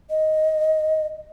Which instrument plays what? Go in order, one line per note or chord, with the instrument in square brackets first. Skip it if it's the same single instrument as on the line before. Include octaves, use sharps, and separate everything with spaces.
[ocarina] D#5